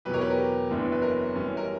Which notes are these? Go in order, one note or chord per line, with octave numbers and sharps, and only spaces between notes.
E2 B2 F#3 G4 B4
A#4 C#5
G4 B4
A#4
G4
F#1 F#2 E3 B3 D4
B4
A#4
F#2 E3 G3 C#4
A#4